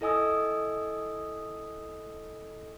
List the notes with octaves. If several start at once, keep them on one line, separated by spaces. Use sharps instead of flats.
E4 A4 D#5 G#5 D#6 E6